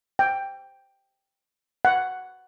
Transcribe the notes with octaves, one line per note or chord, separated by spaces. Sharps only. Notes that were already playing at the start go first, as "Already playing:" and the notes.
G5
F#5